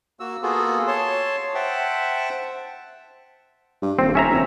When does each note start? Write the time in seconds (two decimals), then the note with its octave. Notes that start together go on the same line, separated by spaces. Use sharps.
0.20 A#3 F#4 E6
0.43 A#3 B3 F4 F#4 G#4 A4
0.87 C#5 A5 C6
1.55 C5 E5 F#5 G5 A5
3.82 G2
3.99 D#1 C4
4.15 C#4 E5 A#5
4.30 F1